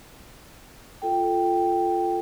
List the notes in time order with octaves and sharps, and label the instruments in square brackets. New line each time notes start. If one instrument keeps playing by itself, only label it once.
[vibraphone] F4 A4 G5